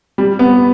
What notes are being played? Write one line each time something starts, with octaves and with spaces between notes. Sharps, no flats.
G3
B3